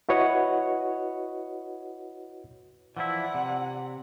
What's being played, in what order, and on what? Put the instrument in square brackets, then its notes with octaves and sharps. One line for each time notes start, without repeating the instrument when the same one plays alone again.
[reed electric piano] E4 F#4 B4 C#5 D#5 F#5
[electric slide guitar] E3 F3 E4 [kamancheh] D5 F#5
[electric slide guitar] C3